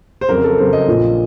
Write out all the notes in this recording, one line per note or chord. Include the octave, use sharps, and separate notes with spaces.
C5
F2 C#3 F#3 A#4
A4
F2 C#3 F#3 C5
D#5
A#1 A#2 F3